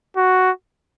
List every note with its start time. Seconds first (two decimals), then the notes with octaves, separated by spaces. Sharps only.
0.17 F#4